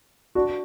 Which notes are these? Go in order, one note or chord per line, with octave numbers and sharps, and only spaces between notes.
D4 F#4